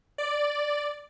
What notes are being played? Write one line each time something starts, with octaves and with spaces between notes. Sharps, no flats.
D5